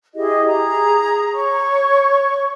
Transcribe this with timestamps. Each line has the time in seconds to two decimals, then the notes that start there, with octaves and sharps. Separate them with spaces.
0.14 E4 G4 G#4 D#5
0.48 G#4 A#5
1.34 C#5 C#6